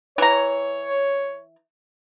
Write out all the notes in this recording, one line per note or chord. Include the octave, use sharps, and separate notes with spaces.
E3 C#5 A#5